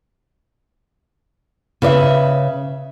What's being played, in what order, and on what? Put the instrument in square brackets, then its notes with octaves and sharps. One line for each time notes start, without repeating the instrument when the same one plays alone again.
[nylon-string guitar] C#3 B4 D5 E5